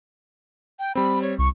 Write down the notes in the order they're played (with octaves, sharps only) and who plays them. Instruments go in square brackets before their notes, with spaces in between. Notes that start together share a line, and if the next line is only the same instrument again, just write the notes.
[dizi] G5
[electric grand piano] G3 C4 [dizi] B5
[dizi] C#5
[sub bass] C2 [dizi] C#6